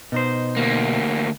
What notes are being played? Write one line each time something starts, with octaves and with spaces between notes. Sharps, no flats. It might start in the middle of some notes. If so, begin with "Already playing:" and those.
B2 D#4 C5
D2 A#3